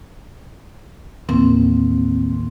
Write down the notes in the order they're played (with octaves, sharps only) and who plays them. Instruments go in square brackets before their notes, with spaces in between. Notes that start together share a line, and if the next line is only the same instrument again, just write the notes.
[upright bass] A1 D#2 [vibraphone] C4